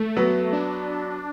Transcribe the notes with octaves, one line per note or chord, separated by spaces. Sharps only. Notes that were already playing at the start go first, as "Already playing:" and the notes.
Already playing: A3
F#3 B3
D4